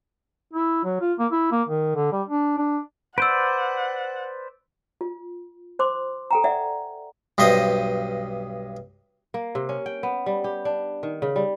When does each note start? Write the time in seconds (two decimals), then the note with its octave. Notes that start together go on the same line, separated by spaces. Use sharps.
0.54 E4
0.85 F#3
1.01 F4
1.19 A#3
1.32 E4
1.52 A#3
1.69 D#3
1.96 D3
2.12 G3
2.29 D4
2.58 D4
3.18 B4 C5 D5 F#5 E6 D7
5.01 F4
5.79 C5 C6 D6
6.31 A4 G5 A#5
6.44 D5 E5 F#5
7.38 B1 G2 B3 C5 D#5 D#6
9.34 A#3
9.55 C3
9.69 C#4
9.86 G5
10.03 B3
10.26 G3
10.44 G4
10.65 D4
11.03 D#3
11.22 C#3
11.36 G3